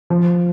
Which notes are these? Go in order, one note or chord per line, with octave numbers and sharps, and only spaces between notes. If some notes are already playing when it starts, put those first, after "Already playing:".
F3